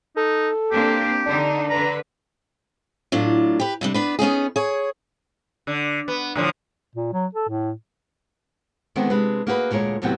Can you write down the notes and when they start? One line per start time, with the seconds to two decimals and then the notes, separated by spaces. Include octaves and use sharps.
0.17 D#4 A4
0.71 A#3 C4 D4 G4
1.26 D3 D4 D#4
1.70 D3 B4 A#5
3.12 A2 F#3 D4 F4
3.60 G4 B4
3.81 C3 G3 D4
3.94 B3 D4 B4
4.19 B3 C#4 D#4 G#4
4.56 G#4 C#5
5.67 D3
6.08 B3
6.35 A2 D3 F3
6.95 A#2
7.13 F#3
7.35 A4
7.49 A2
8.96 D3 D#3 G#3 B3 C4 D4
9.10 C3 G#3 D4 B4
9.47 A#3 D#4 F#4 G#4 B4
9.71 D2 A#2 G#3 A#4 C#5
10.02 D#2 A2 C3 F#3 B3 G5